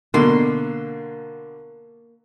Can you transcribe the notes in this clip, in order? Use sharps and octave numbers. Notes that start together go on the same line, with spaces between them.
B2 D3 A#3 C6